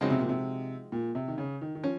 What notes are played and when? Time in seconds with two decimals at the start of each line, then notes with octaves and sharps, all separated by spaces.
0.01 C#3 F3 G#3 C4 D#4 F#4
0.10 C3
0.19 A#2
0.29 C3
0.92 A#2
1.15 C3
1.28 D#3
1.38 C#3
1.61 D#3
1.75 D#3
1.84 F3 C#4